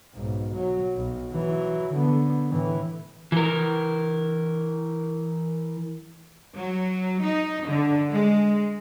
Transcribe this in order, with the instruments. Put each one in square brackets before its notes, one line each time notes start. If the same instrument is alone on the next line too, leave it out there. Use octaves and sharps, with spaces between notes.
[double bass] B1 G#2
F#3
B1 B2
E3 F#3
D3 B3
A2 E3
[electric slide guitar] E3 A#4
[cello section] F#3
D#4
D3
G#3